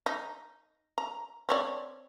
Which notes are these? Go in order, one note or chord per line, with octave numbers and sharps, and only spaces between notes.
D#4
A#5
C4 C#5 D5